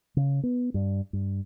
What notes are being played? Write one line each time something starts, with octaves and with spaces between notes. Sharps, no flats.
C#3
B3
G2
G2